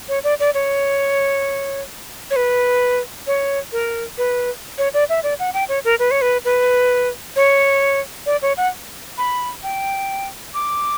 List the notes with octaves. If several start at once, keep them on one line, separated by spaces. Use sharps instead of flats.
C#5
D5
D5
C#5
C#5
B4
C#5
A#4
B4
C#5
D5
E5
D5
F#5
G5
C#5
A#4
B4
C#5
B4
B4
C#5
D5
C#5
F#5
B5
G5
D6